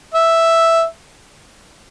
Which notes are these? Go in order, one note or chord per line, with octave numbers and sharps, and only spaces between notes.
E5